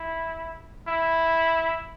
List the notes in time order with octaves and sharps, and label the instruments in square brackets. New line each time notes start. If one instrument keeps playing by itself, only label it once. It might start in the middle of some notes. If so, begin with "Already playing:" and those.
Already playing: [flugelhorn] E4
E4